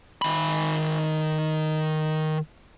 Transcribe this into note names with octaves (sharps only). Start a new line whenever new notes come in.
D#3 B5